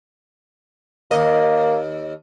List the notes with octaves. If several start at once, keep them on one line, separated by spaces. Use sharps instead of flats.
D#2 A#3 D#5